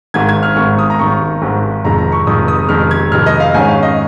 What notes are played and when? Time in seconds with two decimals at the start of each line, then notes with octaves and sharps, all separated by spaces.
0.14 G#1 G#2 D#3 G#6
0.29 G#6
0.43 F6
0.56 G#1 G#2 D#3 C#6
0.79 D#6
0.90 A#5
0.99 G#1 G#2 D#3 C#6
1.42 G#1 G#2 D#3
1.84 F1 F2 D#3 G#3 A#5
1.98 A#5
2.12 C#6
2.27 F1 F2 D#3 G#3 D#6
2.48 D#6
2.69 F1 F2 D#3 G#3 F6
2.91 G#6
3.12 F1 F2 D#3 G#3 F6
3.26 D#5
3.40 F5
3.54 G#2 D#3 C#4 G#5
3.69 F5
3.83 D#5